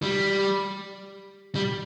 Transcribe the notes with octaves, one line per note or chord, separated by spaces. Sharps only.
G3
G3